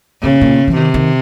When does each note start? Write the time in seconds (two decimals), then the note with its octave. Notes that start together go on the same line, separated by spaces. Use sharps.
0.22 A#2 C#3
0.41 A#2
0.68 E3
0.76 C3 D#3
0.94 D#3